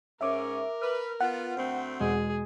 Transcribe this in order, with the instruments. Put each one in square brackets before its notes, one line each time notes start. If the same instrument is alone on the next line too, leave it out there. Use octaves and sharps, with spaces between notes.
[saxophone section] G#2 C#4 [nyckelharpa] A#4 [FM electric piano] E5 D6
[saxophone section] B4 [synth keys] F6
[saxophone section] B3 F4 [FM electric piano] F#5
[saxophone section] D2 A3 C4
[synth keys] E2 B2 G#3 [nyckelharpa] G#4